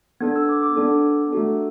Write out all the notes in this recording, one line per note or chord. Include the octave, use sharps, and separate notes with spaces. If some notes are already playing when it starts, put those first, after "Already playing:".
B3 D4 A4 G#6
E6
D6
D6
B3 D4 A4
A3 D4 F#4 A4